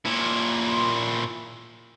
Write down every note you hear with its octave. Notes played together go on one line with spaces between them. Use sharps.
A#2 E4